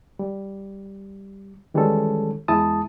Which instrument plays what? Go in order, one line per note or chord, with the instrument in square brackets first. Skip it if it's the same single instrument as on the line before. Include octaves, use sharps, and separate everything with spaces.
[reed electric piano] G3
D#3 E3 G3 G#3 C#4 A4
E2 G#3 E4 A5 D#6